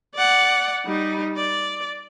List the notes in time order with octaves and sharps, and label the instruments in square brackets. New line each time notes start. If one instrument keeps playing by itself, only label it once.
[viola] D5 F#5
G3 D#4
D5